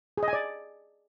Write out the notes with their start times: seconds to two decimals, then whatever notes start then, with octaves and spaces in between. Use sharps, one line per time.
0.18 G#4
0.23 D#5
0.28 G#5
0.33 D5